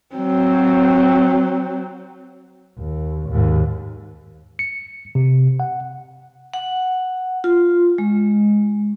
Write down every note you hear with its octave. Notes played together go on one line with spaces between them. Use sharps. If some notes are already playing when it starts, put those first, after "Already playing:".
F#3 C4
D#2
D#2 G#2
C#7
C3
F#5
F#5
F4
G#3